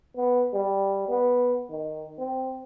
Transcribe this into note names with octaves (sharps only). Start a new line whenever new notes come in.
B3
G3
B3
D#3
C4